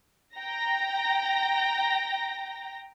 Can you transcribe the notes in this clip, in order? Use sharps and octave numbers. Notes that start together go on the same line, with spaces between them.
G5 A#5 A#6